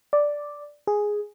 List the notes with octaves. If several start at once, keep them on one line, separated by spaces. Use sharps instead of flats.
D5
G#4